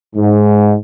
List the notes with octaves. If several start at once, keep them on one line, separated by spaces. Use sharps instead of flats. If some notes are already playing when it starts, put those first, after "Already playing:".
G#2